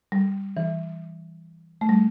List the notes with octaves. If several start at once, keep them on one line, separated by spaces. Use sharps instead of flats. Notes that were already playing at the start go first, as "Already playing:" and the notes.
G3
E3
A3
G3